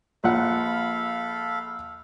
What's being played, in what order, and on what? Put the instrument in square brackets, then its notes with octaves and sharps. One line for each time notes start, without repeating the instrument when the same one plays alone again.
[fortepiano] A#1 F#5 [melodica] A4 F5 B5